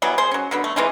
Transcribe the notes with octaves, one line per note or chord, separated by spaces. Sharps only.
E3 F#3 G3 B3
G#4 C5
F#3 C#4
D3 F#3 B3
A3
E3 G#3 C4 D#4